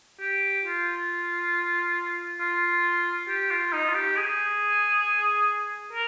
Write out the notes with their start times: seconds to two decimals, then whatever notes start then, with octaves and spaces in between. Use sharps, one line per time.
0.20 G4
0.65 F4
2.40 F4
3.28 G4
3.51 F4
3.73 D#4
3.89 F4
3.94 G4
4.16 G#4
5.93 A#4